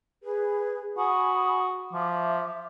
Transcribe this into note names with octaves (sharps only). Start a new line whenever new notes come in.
G#4 B4
F#4 G#5 B5 D#6
F3 E5 D6